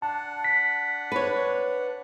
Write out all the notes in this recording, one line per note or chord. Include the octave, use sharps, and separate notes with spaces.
D4 F#5 A5
B6
B4 C#5